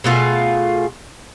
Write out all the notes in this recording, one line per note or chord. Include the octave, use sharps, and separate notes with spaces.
B2 A3 F4 G#4